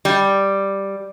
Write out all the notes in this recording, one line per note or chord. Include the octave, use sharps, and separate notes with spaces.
G3